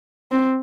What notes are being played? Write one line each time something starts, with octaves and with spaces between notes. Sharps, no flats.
C4